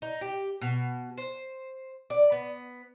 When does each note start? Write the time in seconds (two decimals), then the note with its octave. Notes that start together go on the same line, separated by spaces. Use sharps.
0.02 D#4
0.21 G4
0.61 B2
1.18 C5
2.10 D5
2.32 B3